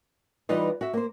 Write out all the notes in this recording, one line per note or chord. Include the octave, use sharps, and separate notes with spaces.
E3 G3 D#4 F4 B4 D#5
F#4 E5
A#3 C5